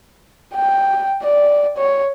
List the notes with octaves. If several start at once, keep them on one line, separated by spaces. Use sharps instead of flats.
G5
D5
C#5